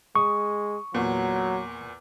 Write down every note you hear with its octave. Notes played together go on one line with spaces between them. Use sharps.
G#3 C#6 D#6
E2 A#2 F#3